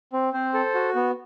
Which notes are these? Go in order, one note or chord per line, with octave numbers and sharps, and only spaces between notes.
C4
C4 C5
A4
F#4
B3